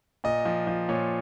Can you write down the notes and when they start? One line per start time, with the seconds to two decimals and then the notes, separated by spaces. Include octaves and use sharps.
0.24 A#2 D#5
0.45 F3
0.67 F3
0.89 A#2 C#5